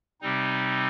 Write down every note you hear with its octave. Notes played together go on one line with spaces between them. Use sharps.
C3 G3 C4 D#4